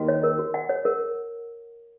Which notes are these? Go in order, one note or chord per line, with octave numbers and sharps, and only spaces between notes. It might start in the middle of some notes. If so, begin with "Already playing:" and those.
Already playing: D#2 D#3 F#4
C#5
A#4
F#4
F#5
C#5
A#4